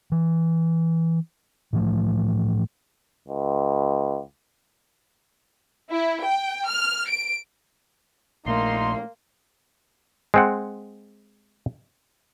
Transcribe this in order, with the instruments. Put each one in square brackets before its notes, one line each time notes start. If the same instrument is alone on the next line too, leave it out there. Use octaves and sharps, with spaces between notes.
[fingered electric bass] E3
A2 E3 F3 A3
[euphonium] C#2
[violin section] E4
G5
F6
D7
[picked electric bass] A#1 A#2 A3 [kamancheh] A#3 [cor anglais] D#4 [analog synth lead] C6
[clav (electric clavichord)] G#3 C4 F#5